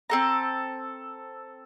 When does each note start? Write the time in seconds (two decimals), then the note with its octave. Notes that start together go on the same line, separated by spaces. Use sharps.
0.10 C4 A4 A#5